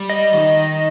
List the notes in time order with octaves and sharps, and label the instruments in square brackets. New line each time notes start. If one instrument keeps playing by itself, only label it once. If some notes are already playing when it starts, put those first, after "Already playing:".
Already playing: [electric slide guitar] G3
[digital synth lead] D#5
[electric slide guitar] D#3 [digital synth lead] D#5